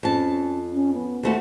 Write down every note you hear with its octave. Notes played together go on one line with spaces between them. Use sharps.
F2 C#4 A5
C#4
B3
D#2 A3 F#4 C5